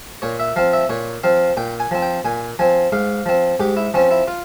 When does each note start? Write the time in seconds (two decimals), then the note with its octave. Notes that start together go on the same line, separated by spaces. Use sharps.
0.22 A#2 C#5
0.40 E5
0.56 F3 C4 F5
0.73 E5
0.89 A#2 C#5
1.24 F3 C4 F5
1.57 A#2 G5
1.80 G#5
1.91 F3 C4
2.02 G5
2.25 A#2 G#5
2.59 F3 C4 G#5
2.92 G#2 F5
3.26 F3 C4
3.60 G#2 G4
3.77 E4
3.94 F3 C4 C#4
4.11 E4
4.28 F4